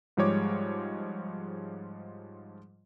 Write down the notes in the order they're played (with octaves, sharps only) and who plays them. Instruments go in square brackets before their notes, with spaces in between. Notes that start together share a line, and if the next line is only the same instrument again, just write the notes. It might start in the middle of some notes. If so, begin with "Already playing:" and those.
[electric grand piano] G#2 F3 G3 G#3 C#5 D6